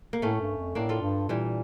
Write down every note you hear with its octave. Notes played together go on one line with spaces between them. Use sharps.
A#3
A2 A3 C#4
G2
F2
A2 A#3 D4
F4 A4
G2
A#2 E3 G3